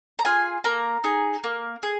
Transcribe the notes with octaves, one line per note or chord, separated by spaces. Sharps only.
A#5
F4 G#4 G#5
A#3 A#5
D#4 G#4
A#3
G#4